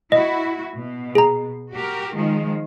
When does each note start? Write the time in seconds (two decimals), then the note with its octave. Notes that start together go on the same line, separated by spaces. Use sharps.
0.12 E4 F#4 D#5
0.75 B2
1.15 G#4 A#5
1.73 F#4 G4 A#4
2.16 D#3 F3 G#3